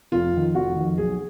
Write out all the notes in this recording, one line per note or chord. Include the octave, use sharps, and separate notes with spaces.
F1 F4
F2 D#3
F1 F#4
F2 D#3
B1 G#4